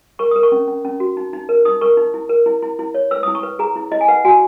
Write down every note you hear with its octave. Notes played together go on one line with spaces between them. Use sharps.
A#4 C#6
A#4 D#6
C#6
C#4
C#4
C#4
F#4
D#4
D#4
A#4
D#4 D#6
A#4 C#6
D#4
E4
A#4
E4
E4
E4
C#5
B4 E6
D#6
E4
C#6
B4
G#4 A#5
E4
E4 D#5
G#5
B4 F#5
F#4 G#5